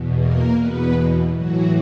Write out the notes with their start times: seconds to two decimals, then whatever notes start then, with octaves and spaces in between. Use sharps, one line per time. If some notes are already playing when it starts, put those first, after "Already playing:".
Already playing: E2 B2
0.19 A#3 A#4
0.57 E2 B2 B3 B4
1.34 A2 E3 F#3 F#4